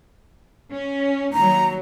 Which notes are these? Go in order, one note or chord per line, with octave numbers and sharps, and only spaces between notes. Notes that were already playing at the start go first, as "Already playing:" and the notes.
C#4
D#2 F#3 A#5